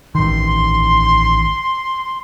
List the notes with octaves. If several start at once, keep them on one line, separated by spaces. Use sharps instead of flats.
A1 D#3 C6